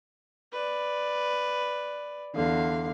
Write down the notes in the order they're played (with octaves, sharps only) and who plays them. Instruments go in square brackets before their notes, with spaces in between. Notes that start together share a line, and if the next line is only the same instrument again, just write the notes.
[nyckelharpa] B4 D5
[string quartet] E2 D3 F5